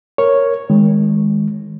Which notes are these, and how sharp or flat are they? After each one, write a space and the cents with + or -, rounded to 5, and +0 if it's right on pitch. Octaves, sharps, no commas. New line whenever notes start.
A#4 +0 C#5 +0
D#3 +25 G#3 -5